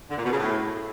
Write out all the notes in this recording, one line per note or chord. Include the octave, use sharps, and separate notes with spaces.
D3
A#2
B2
C#3
A2